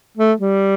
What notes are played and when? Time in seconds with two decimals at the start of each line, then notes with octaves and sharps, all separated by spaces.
0.17 A3
0.40 G3